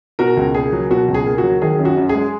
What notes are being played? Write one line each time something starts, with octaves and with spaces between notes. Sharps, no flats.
B2 F#4 A#4
C#2
A#3 G#4
F#3
B2 F#4
C#2
G#4
A#3
F#4
F#3
D#3 G#4
F#2
F#4
F#2
G#4
G#3